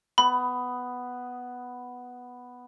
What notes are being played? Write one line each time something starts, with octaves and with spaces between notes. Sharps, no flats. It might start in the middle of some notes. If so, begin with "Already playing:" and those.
B3 B5